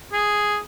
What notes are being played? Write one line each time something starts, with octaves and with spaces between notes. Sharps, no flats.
G#4